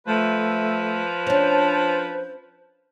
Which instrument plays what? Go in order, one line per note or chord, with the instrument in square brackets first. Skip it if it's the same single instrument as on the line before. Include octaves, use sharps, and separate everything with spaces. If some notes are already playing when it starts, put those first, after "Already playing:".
[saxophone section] F3 B4 [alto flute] A3
[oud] C#4 D4 [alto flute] C5